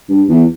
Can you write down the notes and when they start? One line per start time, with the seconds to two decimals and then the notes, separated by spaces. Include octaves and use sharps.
0.09 G2
0.29 E2